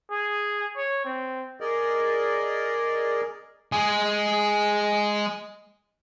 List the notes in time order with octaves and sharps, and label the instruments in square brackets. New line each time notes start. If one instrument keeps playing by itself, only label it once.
[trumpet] G#4
C#5
C4
[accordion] G#4 A#4 D5 D#5
[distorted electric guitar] G#3 G#4